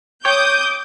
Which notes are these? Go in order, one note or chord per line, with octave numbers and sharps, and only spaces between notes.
C#5 G5 D6 D#6 G6